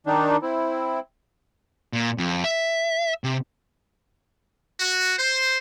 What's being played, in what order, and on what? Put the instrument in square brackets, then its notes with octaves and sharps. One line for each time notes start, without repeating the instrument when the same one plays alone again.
[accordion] D#3 D4 D#4
C4 E4
[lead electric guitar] A#2
F2
E5
C3
[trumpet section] F#4
C5